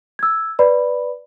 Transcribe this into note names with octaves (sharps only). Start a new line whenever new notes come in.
E6 G#6
B4 D5 B5